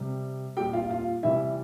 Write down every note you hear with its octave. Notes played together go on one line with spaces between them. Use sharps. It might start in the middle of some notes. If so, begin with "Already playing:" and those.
Already playing: C3 G3
A#2 G3 G4 G5
F4 F5
F4 F5
C3 E3 G3 E4 E5